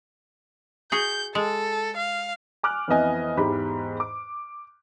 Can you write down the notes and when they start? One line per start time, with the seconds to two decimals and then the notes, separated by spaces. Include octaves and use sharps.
0.92 F#4 G#4 G6
1.35 G#3 A4
1.97 F5
2.63 G#5 D6 F6 F#6
2.88 F2 E3 B3 D#5 G#5
3.37 E2 G#2 G4 B5
4.00 D6